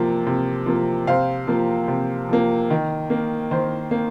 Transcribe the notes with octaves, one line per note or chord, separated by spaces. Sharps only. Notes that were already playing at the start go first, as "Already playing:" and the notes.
Already playing: C3 F3 A#3
C3
F3 A#3
C3 C5 F5
F3 A#3
C3
F3 A#3
D#3
A#3
D#3 C5
A#3